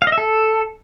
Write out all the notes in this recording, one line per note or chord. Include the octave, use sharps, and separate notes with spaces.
F5
D#5
E5
A4